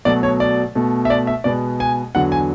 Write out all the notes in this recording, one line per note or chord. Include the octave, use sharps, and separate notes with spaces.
B2 F#3 A3 D5
C#5
D5
B2 A3
E5
D5
E5
B2 G#3 B3 D5
G#5
E2 D3 F#3 F#5
G#5